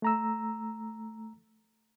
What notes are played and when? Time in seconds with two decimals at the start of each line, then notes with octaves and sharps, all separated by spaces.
0.02 A3 A#5 E6